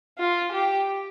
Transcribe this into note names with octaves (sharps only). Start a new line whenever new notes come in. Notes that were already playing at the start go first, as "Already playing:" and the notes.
F4
G4